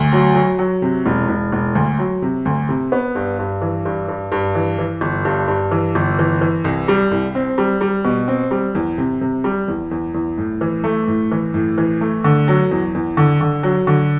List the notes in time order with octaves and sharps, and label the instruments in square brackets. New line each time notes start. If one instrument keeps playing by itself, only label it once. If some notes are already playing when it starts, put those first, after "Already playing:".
Already playing: [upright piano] D2
F#3
F#3
F#3
C3
E1
E1
E1
D2
F#3
C3
D2
C3
B3
G2
G2
E3
G2
G2
G2
E3
E3
G1
G2
G2
E3
G1
E3
E3
C2
G3
C2
C4
G3
G3
B2
C4
G3
E2
C3
C3
G3
E2
E2
E2
A2
E3
A3
A2
E3
A2
E3
A3
D3
F#3
E2
E2
D3
D3
F#3
D3